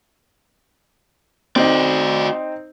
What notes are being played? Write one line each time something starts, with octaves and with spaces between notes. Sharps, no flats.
C4 D#4 F#4 D5